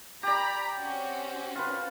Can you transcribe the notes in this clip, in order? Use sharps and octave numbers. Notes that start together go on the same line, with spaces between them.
G4 D5 A#5 B5
C4 C#4 F#4
F4 B4